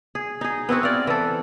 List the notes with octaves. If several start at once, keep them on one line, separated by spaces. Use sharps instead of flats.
G#4
D#4 G#4
B3 C4 E4 F#4
D5 F5
E3 A4